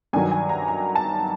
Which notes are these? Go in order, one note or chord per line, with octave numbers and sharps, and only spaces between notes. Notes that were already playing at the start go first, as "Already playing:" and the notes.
G2 D#3 F#3 G#5
G#5
A#5
A#5
A5